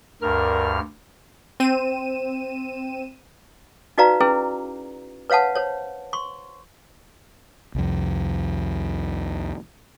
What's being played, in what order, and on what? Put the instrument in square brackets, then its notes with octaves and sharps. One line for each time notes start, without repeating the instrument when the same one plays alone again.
[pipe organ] D2 G2 F6 [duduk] A#4
[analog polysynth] C4 D#7 E7
[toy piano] D#4 F#4 B4 D5 F5 A#5
C#4 E4 G#4 B4
B4 C#5 F5 F#5 A5
C5 C#5
C6 C#6
[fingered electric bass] C2 F2